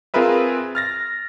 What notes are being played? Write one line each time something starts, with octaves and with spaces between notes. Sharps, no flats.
C4 F4 G#4 A#4 B4 E5
F6 A6 A#6